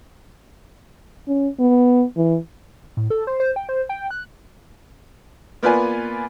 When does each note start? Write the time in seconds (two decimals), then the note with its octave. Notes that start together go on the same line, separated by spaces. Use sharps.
1.28 C#4
1.60 B3
2.17 E3
2.97 A2
3.10 A4
3.27 C5
3.40 C5
3.56 G5
3.69 C5
3.89 G5
4.11 F#6
5.63 A#3 B3 F4 B4 D5 G#5